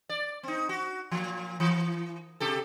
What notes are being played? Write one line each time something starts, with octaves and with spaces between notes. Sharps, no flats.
D5
C4 D#4
F#4
A#2 F3
E3
C3 G4 A4